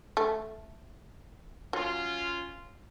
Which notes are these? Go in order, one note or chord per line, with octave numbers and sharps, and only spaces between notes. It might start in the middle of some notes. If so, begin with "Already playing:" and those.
A3
F#3 C#4 F4